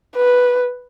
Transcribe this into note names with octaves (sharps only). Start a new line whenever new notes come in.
B4